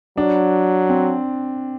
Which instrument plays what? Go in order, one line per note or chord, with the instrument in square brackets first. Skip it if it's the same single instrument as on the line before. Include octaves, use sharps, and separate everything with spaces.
[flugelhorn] F#3 [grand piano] D4
[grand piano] C4